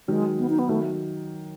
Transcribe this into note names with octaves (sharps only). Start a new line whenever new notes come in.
D#3 F#3 G#3
B3
D#4
B3
D#3 F#3 A3